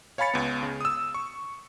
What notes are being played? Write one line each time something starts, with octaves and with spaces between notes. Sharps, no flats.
C#5 F5 G#5 B5 A6 C#7
C#2 B3
C#3
D#6 E6
C#6